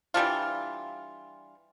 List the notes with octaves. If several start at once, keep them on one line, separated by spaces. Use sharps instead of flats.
E3 G3 D4 F4